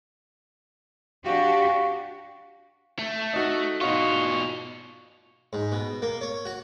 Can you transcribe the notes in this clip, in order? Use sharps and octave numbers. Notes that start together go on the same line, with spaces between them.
D4 F#4 G4 F5 C#6
A3
D#4 F#4
B2 D#4 F4 F#4 C#6
G#2
B2
A#3
C#5
F#4